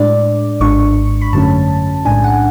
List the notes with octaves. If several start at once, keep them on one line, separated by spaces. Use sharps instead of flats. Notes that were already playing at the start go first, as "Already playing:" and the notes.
Already playing: A2 G#3 D4 D5
G#1 G#2 G#3 D4 C#6
B5
F#2 D3 F#3 A3 C#4 A5
B1 A2 G#3 D4 G#5
F#5